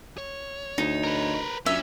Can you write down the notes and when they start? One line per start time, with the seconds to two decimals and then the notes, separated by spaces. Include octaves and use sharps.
0.18 C#5
0.78 D2 D#4
1.04 A#4 B4
1.66 F#2 C#4 D4 F4 E5